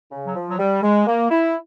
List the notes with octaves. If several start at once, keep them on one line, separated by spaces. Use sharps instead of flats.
C#3
F#3
F3
F#3
G3
G#3
A#3
E4